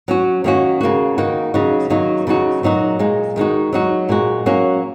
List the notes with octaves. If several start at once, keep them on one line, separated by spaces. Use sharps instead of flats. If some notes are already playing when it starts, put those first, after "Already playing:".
F#3 C#4 F#4
D#3 A#3 C#4 F#4
C#3 A#3 F#4
D#3 A#3 D#4 F#4
C#3 F#3 D#4 F#4
D#3 F#3 A#3 D#4 F#4
C#3 F#3 D#4 F#4
A#2 F#3 D#4 F#4
A#2 G#3 D#4
D#3 G#3 D#4 F#4
F#3 D#4 F#4
A#2 G#3 F#4
F#3 A#3 C#4 F#4